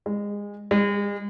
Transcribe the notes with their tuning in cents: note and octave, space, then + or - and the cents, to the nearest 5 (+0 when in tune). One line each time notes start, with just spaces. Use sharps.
G#3 -25
G#3 -40